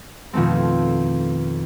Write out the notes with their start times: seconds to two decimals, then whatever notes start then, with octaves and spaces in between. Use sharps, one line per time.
0.33 F2 B2 D#3 A3 C4